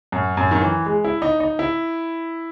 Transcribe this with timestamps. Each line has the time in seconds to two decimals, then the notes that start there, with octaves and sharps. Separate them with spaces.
0.12 F#2
0.37 F#2
0.51 D#3
0.62 E3
0.86 G#3
1.04 E4
1.22 D#4
1.40 D#4
1.59 E4